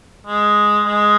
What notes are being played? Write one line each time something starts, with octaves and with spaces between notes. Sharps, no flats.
G#3
G#3